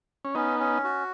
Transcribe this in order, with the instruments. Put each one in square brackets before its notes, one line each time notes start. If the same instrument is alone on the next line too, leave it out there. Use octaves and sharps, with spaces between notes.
[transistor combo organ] C#4
[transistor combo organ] B3 D#4 [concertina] C#4
[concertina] C#4
F#4